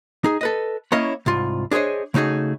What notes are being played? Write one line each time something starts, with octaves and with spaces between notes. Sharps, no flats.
D#4 G#4
A4 B4 D#5
A#3 C#4 E4 C#5 D#5 F5
C2 G#2 F4
D4 G#4 C5 C#5 D#5
C#3 A3 D#4 F#4 G#4